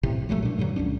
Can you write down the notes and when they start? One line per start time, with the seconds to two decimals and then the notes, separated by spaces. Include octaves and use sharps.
0.03 B1 A2 C3
0.29 F3 F#3 G#3 A3
0.43 A#2 D4
0.58 G2 A#2 D3 F#3
0.76 C#2 C#4 D4